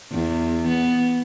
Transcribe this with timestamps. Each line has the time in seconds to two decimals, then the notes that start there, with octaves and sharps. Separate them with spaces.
0.12 E2
0.68 B3